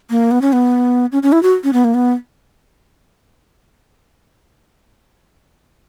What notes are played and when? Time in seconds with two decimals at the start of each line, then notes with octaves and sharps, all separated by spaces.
0.10 A#3
0.31 B3
0.42 C#4
0.53 B3
1.12 C#4
1.23 C#4
1.32 E4
1.43 F#4
1.64 C#4
1.73 B3
1.84 A#3
1.94 B3